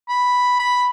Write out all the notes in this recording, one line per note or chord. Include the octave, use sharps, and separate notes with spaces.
B5
B5